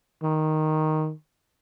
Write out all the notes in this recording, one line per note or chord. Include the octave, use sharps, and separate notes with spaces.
D#3